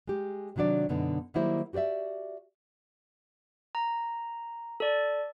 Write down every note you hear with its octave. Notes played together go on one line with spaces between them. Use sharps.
G#3 G4
C3 D#3 F#3 D4 D5
F#2 B2 D3 B3 D4 D#4
D#3 F#3 G3 A#3 E4 C5
F#4 G4 B4 D5 E5
A#5
A4 D5